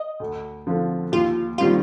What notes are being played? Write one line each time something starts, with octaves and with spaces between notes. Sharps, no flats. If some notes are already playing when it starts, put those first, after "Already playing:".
Already playing: D#5
D2
D3 F3 C4 F4
D#2 F4
D#3 G3 C4 F4